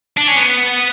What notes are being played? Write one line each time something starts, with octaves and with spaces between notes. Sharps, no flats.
D4
C#4
B3